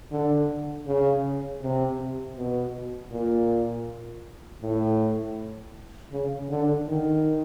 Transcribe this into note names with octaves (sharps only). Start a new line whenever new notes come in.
D3
C#3
C3
B2
A#2
A2
C#3
D3
D#3